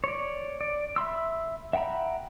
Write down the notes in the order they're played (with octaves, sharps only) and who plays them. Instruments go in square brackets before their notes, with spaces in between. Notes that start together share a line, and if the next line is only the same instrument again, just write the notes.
[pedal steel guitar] C#5 D5
D5
E5 B5 C6 E6
E5 F#5 G5 A#5 B5